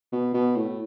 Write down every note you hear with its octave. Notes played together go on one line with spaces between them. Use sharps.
B2
B2
A2